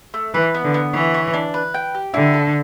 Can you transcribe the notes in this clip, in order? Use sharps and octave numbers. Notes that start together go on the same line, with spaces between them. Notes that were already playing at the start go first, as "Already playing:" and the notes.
A3
E3 B4
B3
D3
B3
E3 C#5
C#5
D4
B4
G5
G4
D3 E4
A4